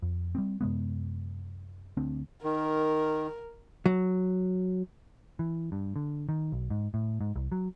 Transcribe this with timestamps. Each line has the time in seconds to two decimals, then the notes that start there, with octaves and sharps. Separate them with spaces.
0.02 F2
0.35 G3 B3 C4
0.61 F#2 C3 G#3 B3
1.97 D2 C4 D4
2.44 D#3 A#4
3.86 F#3
5.39 E3
5.72 G2
5.96 D3
6.29 D#3
6.52 B1
6.70 G#2
6.94 A2
7.21 G#2
7.36 C2
7.52 F#3